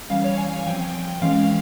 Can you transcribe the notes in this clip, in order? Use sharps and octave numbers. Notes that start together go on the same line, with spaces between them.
E3 G3 C#4 F5
C#5
G#5
F3 C4 G5
E3 G#3 C#4 F5